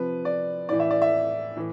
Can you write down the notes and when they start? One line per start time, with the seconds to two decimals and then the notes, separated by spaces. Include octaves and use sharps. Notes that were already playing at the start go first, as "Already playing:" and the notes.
Already playing: C3 F3 B4
0.25 D5
0.69 A2 E3 D5
0.80 E5
0.90 D5
1.02 E5
1.57 A2 E3